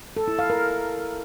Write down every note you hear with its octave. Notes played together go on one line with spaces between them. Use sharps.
A4
E4
F5
A#4